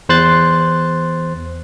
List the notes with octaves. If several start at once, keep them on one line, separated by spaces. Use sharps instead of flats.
E2 C5 C6 F#6 A6